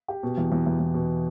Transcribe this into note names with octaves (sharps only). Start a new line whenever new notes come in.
G4
B2
E2
E2
E2
E2
B2